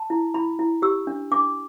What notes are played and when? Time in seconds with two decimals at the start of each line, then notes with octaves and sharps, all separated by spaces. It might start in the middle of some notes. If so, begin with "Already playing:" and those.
Already playing: A5
0.10 E4
0.34 E4 B5
0.59 E4
0.82 G4 E6
1.07 D4
1.32 D4 D6